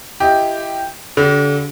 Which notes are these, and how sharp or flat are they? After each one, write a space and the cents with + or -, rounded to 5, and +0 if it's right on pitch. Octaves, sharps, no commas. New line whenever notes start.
E4 +30 G4 +0 D#5 +20
D3 -35 F#4 +45